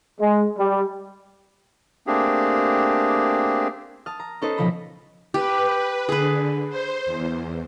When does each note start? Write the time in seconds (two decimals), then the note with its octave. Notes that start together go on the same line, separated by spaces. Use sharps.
0.20 G#3
0.59 G3
2.07 A3 A#3 C4 D4 G4 G#4
4.06 A5 D#6 F6
4.19 A#5
4.42 C#4 D#4 A4 B4 C5 D#5
4.57 B1 C#3 F3 A3 B5 A#6
5.34 G4 B4
6.09 D3 G#4 B4
6.69 C5
7.06 E2